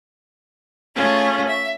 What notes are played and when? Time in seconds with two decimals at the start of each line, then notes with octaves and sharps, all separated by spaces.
0.94 A3 C#4 F4 G#4
1.46 E5